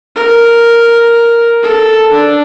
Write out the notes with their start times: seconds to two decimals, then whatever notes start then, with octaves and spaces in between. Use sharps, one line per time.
0.16 A#4
1.63 A4
2.11 D4